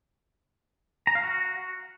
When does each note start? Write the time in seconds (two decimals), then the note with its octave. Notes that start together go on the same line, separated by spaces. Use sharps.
1.07 A#5
1.15 F5
1.23 F#4